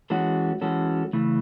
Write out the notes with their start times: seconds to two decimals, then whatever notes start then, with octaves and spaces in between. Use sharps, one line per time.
0.10 E3 G#3 C#4 F#4 A4
0.61 E3 G#3 C#4 F#4 A4
1.13 C#3 E3 A3